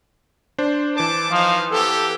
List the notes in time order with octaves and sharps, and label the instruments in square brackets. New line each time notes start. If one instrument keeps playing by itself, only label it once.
[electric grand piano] D4 C5
[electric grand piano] E3 C5 [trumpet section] A5 D6
[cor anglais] F3 [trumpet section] D#4 F5
[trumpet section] A#3 B3 G4 [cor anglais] A4